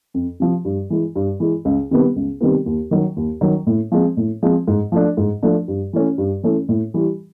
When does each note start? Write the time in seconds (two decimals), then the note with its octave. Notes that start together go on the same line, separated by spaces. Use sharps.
0.14 F2
0.40 C3 F3
0.65 G2
0.90 E3 G#3
1.16 G2
1.40 E3 G#3
1.65 C#2
1.91 C3 D#3 G3 B3
2.16 C#2
2.41 C3 D#3 G3 B3
2.66 D#2
2.91 D#3 F#3
3.16 D#2
3.41 D#3 F#3
3.67 A2
3.92 F3 G#3 C4
4.17 A2
4.43 F3 G#3 C4
4.68 G#2
4.92 F3 A3 D4
5.17 G#2
5.43 F3 A3 D4
5.68 G2
5.93 E3 A3 C#4
6.18 G2
6.43 E3 A3 C#4
6.69 A2
6.94 E3 G3